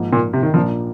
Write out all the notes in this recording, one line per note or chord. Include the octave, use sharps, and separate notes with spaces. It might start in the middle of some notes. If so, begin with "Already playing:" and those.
Already playing: G#1 G#2 F3 A#3
A#2
C3
D#3
A#1 A#2 F3 A#3 F4